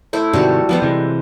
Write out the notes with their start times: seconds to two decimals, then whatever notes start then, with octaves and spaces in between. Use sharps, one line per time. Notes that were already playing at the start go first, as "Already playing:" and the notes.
0.13 A3 E4 C5
0.33 G#2 C3 D#3 G3 F#4 A4
0.69 F3 G3 B3 B4 C5
0.82 C3 E3 G#3